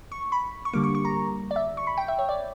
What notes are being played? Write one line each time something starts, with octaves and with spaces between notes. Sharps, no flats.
C#6
B5
C#6
D3 G3 A#3 D6
C#6
C#6
A#5
D5
E5
C#6
B5
G5
E5
C#5
D5